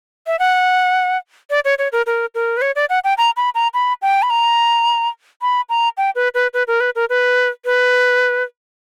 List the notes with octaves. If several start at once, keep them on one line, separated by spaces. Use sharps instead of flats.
E5
F#5
D5
C#5
C#5
A#4
A#4
A#4
B4
C#5
D5
F#5
G5
A#5
B5
A#5
B5
G5
B5
A#5
B5
A#5
G5
B4
B4
B4
A#4
B4
A#4
B4
B4